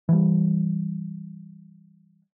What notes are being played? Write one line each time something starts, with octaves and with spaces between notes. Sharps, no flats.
E3 G3